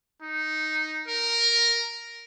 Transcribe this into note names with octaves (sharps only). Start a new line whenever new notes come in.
D#4
A#4